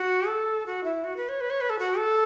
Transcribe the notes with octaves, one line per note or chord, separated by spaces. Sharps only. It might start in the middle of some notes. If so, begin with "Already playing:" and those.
Already playing: F#4
A4
F#4
E4
F#4
B4
C#5
B4
C#5
B4
A4
F#4
A4